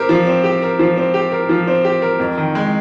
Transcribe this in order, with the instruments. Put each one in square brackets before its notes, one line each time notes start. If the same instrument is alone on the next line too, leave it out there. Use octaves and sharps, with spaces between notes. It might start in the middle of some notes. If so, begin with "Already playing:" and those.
Already playing: [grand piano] C4 G4 A#4
F3
C4
G4
A#4
F3
C4
G4
A#4
F3
C4
G4
A#4
F2
D#3
G#3